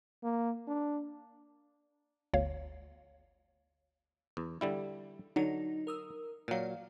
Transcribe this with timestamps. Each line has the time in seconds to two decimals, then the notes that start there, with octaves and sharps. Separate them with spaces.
0.23 A#3
0.67 D4
2.33 G1 D2 C#5 F5
4.37 E2
4.61 D3 G3 E4
5.36 D3 F#3 D#4
5.87 A#4 D#6 E6
6.48 A#2 F#3 D5 F5